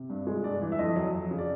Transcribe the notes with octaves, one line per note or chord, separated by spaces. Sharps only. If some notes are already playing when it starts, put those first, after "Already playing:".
Already playing: C3
G2
G#3
G2 D5
E3
E5
F2 D#5
F#3
F2
C#3
D5